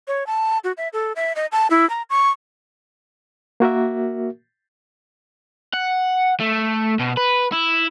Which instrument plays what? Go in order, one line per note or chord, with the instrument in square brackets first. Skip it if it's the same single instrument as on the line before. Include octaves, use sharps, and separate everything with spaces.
[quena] C#5
A5
F#4
E5
A4
E5
D#5
A5
E4
A#5
C#6
[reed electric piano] A#3 F#4 A#4 E5
[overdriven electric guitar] F#5
A3
B2
B4
E4